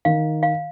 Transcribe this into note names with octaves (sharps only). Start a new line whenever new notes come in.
D#3 F5
F5